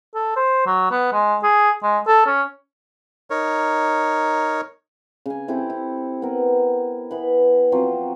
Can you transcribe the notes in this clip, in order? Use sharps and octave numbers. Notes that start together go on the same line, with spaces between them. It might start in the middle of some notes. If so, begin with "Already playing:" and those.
A4
C5
F#3
B3
G#3
G#4
G#3
A4
C#4
D#4 A#4 C#5
C#3 G#5
C4 E4 G4 A4
E4
B3 A#4
E3 B3 B5
F3 F#3 C4